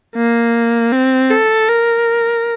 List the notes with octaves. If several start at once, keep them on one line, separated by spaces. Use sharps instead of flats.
A#3
C4
A4
A#4